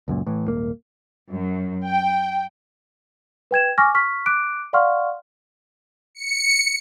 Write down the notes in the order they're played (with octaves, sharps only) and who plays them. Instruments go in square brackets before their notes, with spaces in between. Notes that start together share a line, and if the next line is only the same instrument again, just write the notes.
[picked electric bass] C#2 F#2 A#2
A2 E3
D#1 G#1 A#3
[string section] F#2
G5
[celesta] B4 G5 G#6 E7
G#5 C#6 D6 F6 A#6
C#6 F6 B6
D6 F#6 D7
D5 F5 F#5 C6 C#6 F6
[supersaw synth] C#7